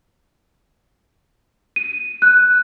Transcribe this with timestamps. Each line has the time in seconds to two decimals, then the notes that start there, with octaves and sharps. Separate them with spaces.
1.76 D#7
2.22 F#6